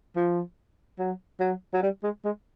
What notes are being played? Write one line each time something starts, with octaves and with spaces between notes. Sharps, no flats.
F3
F#3
F#3
F#3
G3
G#3
G#3